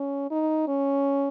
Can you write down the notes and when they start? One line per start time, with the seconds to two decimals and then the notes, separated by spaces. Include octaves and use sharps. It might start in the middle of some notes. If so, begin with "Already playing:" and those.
Already playing: C#4
0.31 D#4
0.68 C#4